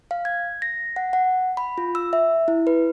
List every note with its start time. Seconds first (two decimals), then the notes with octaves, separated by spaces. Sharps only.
0.11 F5
0.25 G#6
0.62 A#6
0.96 F#5
1.13 F#5
1.57 B5
1.78 F4
1.95 E6
2.13 E5
2.48 E4
2.67 B4